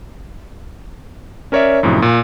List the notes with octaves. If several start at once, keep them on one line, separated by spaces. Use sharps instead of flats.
C#4 A#4 C#5 D5 E5
F#2 A2 C3 F3 D#4
A#2